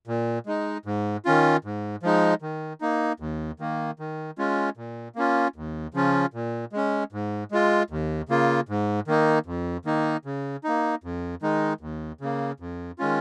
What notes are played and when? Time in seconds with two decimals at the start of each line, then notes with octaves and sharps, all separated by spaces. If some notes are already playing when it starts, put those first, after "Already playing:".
0.07 A#2
0.46 G#3 D#4
0.86 G#2
1.25 D#3 C#4 F4
1.65 G#2
2.03 F3 G#3 D#4
2.42 D#3
2.81 A#3 D#4
3.20 D#2
3.60 D#3 A#3
3.99 D#3
4.38 G#3 C#4 F4
4.77 A#2
5.16 A#3 C#4 F4
5.56 D#2
5.94 C#3 F3 C#4 F4
6.34 A#2
6.73 G#3 C#4
7.12 G#2
7.51 G#3 F4
7.90 D#2
8.29 C#3 A#3 F4
8.69 G#2
9.08 D#3 A#3 D#4
9.46 F2
9.85 D#3 A#3 D#4
10.25 C#3
10.64 A#3 D#4
11.04 F2
11.42 D#3 G#3 D#4
11.81 D#2
12.21 C#3 A#3
12.60 F2
12.99 D#3 G#3 C#4 F4